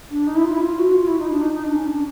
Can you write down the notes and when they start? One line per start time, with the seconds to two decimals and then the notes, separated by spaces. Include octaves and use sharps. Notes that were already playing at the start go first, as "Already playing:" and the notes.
0.10 D4
0.27 D#4
0.35 E4
0.44 F4
0.53 E4
0.61 F4
0.79 F#4
0.95 F4
1.07 E4
1.18 D#4
1.30 D4
1.41 D#4
1.53 D#4
1.64 D4
1.74 C#4
1.86 D4